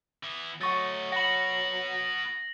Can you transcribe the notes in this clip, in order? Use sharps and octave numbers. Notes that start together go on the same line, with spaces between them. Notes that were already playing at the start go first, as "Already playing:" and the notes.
E3 B3
F#3 A3 D#5 F#5 C#6 A6
B3 F#4 F#5 B5 A#6 F#7